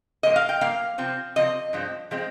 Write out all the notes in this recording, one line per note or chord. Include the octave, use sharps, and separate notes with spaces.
G2 F3 A#3 D#5
F5
G5
G2 F3 A#3 F5
C3 F3 C4
C3 F3 C4 D#5
G2 F3 G#3 C4
F3 G#3 C4